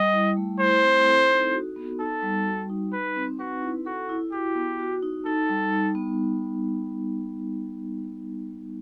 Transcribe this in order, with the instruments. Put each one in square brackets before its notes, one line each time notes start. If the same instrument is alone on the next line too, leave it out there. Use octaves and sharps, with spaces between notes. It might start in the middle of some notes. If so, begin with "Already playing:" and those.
Already playing: [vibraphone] G3 [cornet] D#5
[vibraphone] E4
A3
[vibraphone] E4 [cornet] C5
[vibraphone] C4
A4
D#4
F#4
B3
[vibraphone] D#4 [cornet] A4
[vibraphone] G3
F#4
D#4
[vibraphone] D#4 [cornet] B4
[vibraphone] C4
[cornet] F#4 [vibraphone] B4
[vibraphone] E4
[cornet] F#4 [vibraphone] A4
[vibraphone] E4
[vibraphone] F#4 [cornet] G4
[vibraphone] B3
F#4
D#4
[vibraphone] D#4 [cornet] A4
[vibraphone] G3
D#4
B3